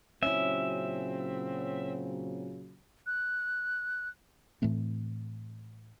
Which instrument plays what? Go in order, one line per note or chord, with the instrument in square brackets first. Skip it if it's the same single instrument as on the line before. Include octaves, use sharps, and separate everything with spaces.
[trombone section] A#2 C#3 F#3 [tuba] C4 [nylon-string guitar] C#4 E4 [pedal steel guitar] E5
[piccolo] F#6
[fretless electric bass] A2 E3 A3 C4